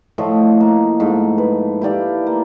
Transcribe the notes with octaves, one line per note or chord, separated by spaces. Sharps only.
A2 F3 A3 D#5
A#3
G#2 A3
B4
E4 G4 D5 F5
A#3